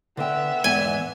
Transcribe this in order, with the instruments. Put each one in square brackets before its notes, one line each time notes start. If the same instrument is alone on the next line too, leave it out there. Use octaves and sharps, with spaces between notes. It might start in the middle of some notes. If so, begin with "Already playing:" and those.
[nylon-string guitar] D3 G5 [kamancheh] B3 E5
[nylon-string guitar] E2 G#2 [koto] G#5